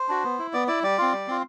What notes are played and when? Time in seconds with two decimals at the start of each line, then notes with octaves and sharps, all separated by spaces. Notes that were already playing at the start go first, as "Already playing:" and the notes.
Already playing: C5
0.09 D4 F#4
0.24 B3
0.39 E4
0.53 B3 D5
0.68 E4 D5
0.83 G3 D5
0.98 C4 F4
1.13 G3
1.28 C4 F4